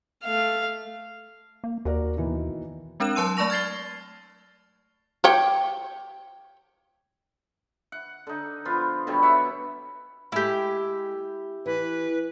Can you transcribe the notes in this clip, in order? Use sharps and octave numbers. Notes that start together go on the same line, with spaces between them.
A3 F5
A#3
D#2 F#4 A#4 D5
B2 D#3 E3
G#3 C4 D4 A#4 F#6 E7
F#3 A5 C6 E6 D#7
A3 D5 A5 C#6 A#6 F7
F6 G#6 A6 C7 G7
G4 C#5 G5
F#5
D3 D#4
F3 B3 F4
B2 D3 F#3 G3
C#5 E5 F#5
G#3 A3 E4 G4 E5
E3 B4